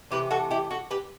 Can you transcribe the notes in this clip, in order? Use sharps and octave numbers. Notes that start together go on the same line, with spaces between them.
C3 E3 A3 G4 B4
F#4 A4
E4 G4
F#4 A4
G4 B4